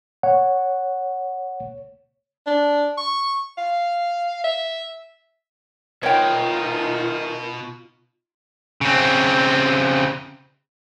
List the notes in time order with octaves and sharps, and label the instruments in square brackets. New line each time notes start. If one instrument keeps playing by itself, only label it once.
[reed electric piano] C#5 [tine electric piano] F#5
[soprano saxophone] D4
C#6
F5
E5
[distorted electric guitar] B2 [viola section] D#4 F4 [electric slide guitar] A#4 D#5 E5 [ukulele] C#5 G5
[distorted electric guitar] C#3 C4